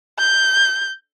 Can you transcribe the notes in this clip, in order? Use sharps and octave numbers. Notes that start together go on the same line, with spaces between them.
G6